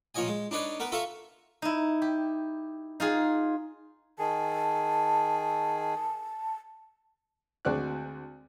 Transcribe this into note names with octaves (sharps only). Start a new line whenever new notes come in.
A#2 F3 C#5 D#5 G#5
G#3
D4 D#4 B4 C#5 D5
B3 A#4 B4
F4 A4 E5 A#5 C#6
D#4 E4
G4
D#4 F4 G#4
D#3 G#4 A5
D2 G#3 C4 F#4 D5 F#6